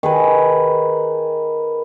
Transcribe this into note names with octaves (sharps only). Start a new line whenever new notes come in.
D#3 G#4 B4